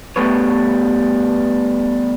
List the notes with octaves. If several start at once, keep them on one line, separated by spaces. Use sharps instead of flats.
G3 A3 B3 B4 C#5